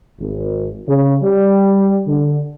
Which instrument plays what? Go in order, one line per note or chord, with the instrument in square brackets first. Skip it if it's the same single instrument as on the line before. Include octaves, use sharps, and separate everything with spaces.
[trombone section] G#1
C#3
G3
D3